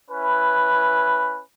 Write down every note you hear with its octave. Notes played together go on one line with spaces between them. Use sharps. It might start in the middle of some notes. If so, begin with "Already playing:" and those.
C#4 E4 B4